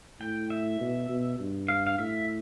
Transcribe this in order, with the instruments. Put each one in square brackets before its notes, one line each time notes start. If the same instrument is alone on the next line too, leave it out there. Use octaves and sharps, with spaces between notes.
[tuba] A2 [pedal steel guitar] G5
[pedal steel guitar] E5
[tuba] B2
B2
G2
[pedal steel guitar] F5
F5
[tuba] A2 [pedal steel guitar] E5